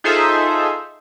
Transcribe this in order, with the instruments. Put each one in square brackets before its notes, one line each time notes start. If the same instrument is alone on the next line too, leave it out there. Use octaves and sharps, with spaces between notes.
[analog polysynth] D#4 F4 G#4 A4 C5 E5